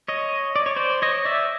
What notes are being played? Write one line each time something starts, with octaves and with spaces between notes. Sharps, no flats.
C#5 D#5
D5
C#5
C5 D5
C#5 D#5
D5 E5